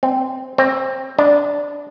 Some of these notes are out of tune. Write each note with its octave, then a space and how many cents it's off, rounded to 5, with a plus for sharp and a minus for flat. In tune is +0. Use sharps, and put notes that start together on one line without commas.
C4 -10
C4 +15
D4 -10